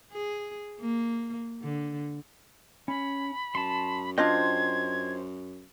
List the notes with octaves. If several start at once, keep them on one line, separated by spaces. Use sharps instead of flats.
G#4
A#3
D3
C#4 B5
F#2 A5 C6
D4 F4 C5 D#5 G5 G#6